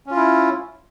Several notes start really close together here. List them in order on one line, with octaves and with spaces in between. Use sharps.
C#4 F4 E4